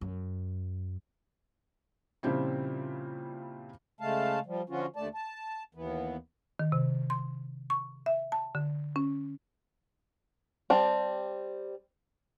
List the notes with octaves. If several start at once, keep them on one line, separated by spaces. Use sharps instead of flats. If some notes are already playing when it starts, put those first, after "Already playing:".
F#2
A#2 C#3 F3 G3 C4 E4
C#3 G#3 A3 F5 A5
F3 G3
D3 F3 C#4 F4 F#4
D#2 D3 A3 D5 A5
A5
D#2 E3 B3
D#3
C3
C6
C#6
E5
A5
D3
C#4
G3 C4 A5